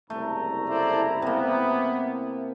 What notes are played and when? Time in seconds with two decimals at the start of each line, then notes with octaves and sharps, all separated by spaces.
0.10 F#1 C2 A3 A#5
0.69 E4 A4 C5 D5
1.22 C3 A#3 B3